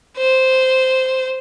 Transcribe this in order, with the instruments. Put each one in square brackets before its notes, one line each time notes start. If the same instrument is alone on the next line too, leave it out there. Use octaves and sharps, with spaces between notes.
[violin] C5